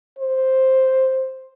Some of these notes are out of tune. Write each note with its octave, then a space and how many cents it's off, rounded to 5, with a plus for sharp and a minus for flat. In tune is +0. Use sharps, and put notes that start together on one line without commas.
C5 +5